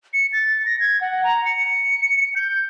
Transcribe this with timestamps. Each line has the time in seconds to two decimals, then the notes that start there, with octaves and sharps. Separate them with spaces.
0.13 C#7
0.33 A6
0.65 A#6
0.80 G#6
1.01 F#5
1.24 A#5
1.45 C#7
2.35 G6